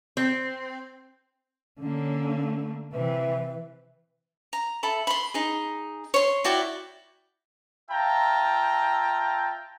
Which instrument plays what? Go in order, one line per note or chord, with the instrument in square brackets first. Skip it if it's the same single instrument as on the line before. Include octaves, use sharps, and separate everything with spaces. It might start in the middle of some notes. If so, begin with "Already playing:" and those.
[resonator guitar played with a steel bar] C4
[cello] D3 A#3 [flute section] C#4
[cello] C3 E3 [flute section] B4 E5
[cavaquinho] A#5
A4 E5 B5
B5 C6
D#4 G#4
C#5 C6
E4 F#4 D5 G5
[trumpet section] F4 E5 G5 A5 A#5